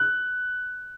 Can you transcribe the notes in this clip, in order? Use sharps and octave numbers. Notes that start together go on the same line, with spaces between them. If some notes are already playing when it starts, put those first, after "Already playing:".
Already playing: F#6